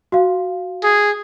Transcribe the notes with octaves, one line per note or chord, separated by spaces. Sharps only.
F#4 F5
G#4